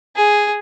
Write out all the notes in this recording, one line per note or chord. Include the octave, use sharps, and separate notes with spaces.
G#4